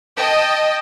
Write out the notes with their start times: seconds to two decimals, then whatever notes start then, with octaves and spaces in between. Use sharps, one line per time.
0.17 D#5 G5 A5